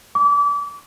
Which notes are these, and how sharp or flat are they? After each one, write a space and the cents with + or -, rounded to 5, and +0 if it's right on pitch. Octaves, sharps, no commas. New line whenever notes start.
D6 -30